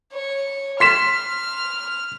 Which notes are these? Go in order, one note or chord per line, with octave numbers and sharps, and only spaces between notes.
C#5
C6 F6 B6 E7